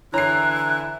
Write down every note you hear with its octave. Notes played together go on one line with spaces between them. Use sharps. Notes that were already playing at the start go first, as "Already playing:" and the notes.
D3 E3 E4 C#5 A#5 F#6 C7